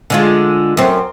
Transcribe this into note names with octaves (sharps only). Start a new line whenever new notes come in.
D3 G#3 F4
F#2 C4